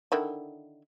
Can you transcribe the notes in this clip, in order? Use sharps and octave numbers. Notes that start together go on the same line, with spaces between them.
D3 D#3 E4